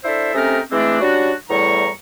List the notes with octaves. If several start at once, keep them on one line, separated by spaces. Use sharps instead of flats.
D4 E4 A4 C5 E5
C3 A3 C4 C#4 D#4 A#4
E3 G#3 A3 C4 D4
G3 C#4 D4 F#4
E2 A2 G3 A#5 C#6